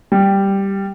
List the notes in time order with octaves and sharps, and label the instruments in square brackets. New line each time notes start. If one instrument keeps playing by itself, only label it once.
[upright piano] G3